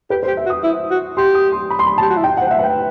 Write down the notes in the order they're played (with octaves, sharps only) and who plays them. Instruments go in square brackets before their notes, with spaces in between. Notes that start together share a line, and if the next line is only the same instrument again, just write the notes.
[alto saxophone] G4 [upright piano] B4
[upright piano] C5
[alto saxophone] G4
[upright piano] E5
[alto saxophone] F#4
[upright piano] D#6
[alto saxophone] E4
F#4
[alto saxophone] G4 [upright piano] C6
[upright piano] D#6
C6
B5
C6
B5
A5
[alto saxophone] G4
F#4
E4
[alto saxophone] D#4 [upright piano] G5
[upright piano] F#5
[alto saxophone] C5
[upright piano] F#5
E5
[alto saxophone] B4 [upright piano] F#5 G5